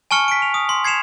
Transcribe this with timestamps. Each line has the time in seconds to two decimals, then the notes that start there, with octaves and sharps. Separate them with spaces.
0.11 G#5 A5 C#6 F6 C#7
0.28 B6 D7
0.42 F7
0.54 D#6
0.69 C6
0.84 G#6 C7 C#7 E7 F7